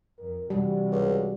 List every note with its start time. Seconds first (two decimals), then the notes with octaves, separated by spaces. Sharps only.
0.19 F2 A#4
0.50 C3 E3 G3 F#4
0.92 C#2